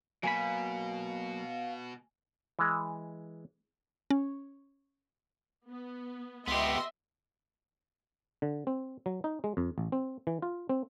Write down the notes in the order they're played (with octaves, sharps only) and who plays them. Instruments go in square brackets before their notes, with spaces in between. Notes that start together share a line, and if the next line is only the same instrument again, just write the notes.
[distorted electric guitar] B2 [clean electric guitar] F#3 A#3 B5 [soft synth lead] F5 [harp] G#5
[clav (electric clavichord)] E3 G#3
[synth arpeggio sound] C#4
[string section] B3
[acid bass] C#2 [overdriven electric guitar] B3 G4 [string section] D#5 E5 C6
[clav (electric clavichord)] D3
C4
F#3
D#4
G#3
F2
A1
C4
E3
F4
C4